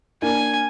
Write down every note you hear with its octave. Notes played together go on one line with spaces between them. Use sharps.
A#3 D4 G#5